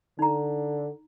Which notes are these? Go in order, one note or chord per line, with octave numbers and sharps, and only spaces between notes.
D3 D#4 A#5